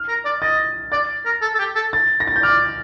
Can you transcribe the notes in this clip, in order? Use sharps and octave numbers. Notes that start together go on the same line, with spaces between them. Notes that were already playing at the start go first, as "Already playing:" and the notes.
Already playing: F6
A#4
D5
D#5 A6
D5 A6
A#4
A4
A4
G4
A4
A6
A#6
A6
G6
D5 F6